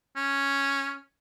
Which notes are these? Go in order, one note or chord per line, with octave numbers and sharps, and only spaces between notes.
C#4